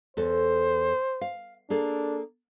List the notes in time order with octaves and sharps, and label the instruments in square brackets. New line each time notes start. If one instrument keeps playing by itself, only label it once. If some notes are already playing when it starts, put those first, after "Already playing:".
[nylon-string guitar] E2 A4 [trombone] C5
[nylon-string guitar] F5
[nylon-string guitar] A#3 G#4 A4 [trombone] D4